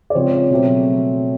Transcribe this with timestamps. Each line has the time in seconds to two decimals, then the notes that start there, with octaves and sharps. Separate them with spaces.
0.10 D5
0.15 C#3 F3 G#3 C4 C#5
0.51 B2 F#3 A3 C4